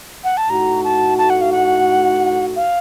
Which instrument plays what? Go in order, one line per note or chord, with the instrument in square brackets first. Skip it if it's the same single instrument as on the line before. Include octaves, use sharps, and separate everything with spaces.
[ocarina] F#5
A5
[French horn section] A2 A3 D#4 F#4 [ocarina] A#5
[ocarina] A5
A5
F#5
F5
F#5
F5